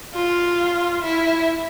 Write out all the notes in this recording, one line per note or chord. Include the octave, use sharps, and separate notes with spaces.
F4
E4